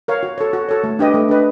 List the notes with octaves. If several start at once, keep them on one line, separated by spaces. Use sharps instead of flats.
A#4 C#5 F5
F#4
A4 C#5
F#4
A4 C#5
A3
D4 G4 B4 D#5
A3
D4 G4 B4 D#5